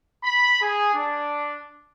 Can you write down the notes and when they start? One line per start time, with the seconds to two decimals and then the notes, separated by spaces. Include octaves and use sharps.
0.24 B5
0.62 G#4
0.95 D4